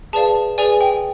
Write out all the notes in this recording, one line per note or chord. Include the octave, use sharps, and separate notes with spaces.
G#4 B4 D5 F5 A5
G#4 B4 D5 G#5
G5